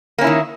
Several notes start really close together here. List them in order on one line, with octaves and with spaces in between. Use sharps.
A#3 C#4 E4 D#3